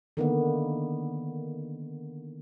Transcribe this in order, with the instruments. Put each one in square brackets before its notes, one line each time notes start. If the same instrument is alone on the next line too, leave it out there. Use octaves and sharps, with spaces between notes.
[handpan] D3 D#3 A#3 B3